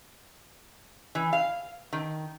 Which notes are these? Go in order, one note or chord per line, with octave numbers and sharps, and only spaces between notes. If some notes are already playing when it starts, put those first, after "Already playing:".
E3
F5
D#3